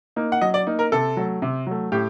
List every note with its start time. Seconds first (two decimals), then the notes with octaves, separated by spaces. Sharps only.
0.16 A#3 D#4
0.32 F#5
0.41 F#3 D#5
0.54 D5
0.67 A#3 D#4
0.79 A#4
0.92 C3 A4
1.17 F#3 A3
1.42 C3
1.67 F#3 A3
1.92 A2 G4